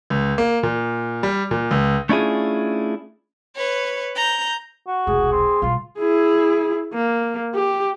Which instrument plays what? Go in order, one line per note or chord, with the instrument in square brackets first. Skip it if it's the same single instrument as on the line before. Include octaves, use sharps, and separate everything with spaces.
[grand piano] C#2
A#3
A#2
G3
A#2
C#2
[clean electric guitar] A3 C#4 D4 E4 F4 G#4
[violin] B4 C#5
A#5 G6
[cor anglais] F#4
[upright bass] E1 C2 [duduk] G#4
[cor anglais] C4
[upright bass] B2 G3 [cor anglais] F4
[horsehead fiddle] E4 G#4
A#3
G4